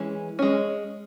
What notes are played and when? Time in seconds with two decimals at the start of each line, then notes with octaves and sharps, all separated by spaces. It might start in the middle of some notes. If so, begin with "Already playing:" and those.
Already playing: E3 G#3 C#4
0.39 G#3 C#4